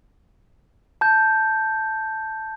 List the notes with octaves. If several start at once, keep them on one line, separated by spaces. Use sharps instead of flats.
A5 G6